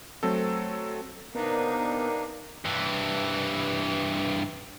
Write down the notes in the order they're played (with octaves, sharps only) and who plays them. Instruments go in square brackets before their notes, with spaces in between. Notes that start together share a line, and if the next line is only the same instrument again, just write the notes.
[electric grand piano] F#3 A3 C4 A4
[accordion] C3 A#3 D4 [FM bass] B3 [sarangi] D#4 [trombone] A#4
[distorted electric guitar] G2 E3